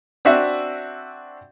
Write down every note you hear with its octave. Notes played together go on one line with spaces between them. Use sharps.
C4 D4 F#4 E5